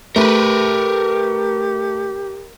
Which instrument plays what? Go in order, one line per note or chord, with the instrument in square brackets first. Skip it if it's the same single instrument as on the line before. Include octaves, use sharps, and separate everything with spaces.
[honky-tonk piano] A3 [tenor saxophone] G4 [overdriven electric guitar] A#4 B4